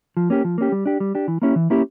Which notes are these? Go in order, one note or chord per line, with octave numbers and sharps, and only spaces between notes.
F3
A#3 C#4 G4
F3
A#3 C#4 G4
G3
D4 G4
G3
D4 G4
E3
A#3 C#4 E4 G4
E3
A#3 C#4 E4 G4